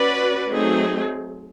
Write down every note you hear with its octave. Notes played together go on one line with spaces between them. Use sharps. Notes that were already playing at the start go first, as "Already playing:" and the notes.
Already playing: C#4 F#4 B4 D5
F#3 A3 C4 D#4 G#4